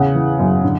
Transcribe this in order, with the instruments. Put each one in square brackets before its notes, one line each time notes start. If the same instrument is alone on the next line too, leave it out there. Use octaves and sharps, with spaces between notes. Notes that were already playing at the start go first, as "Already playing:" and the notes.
Already playing: [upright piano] E2 C#3 F#5
E3
F#2
D3